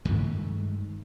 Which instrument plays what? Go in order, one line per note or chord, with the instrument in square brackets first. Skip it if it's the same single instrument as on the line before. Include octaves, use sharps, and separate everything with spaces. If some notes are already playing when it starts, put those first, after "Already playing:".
[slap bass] G2 D#3 G#3 A3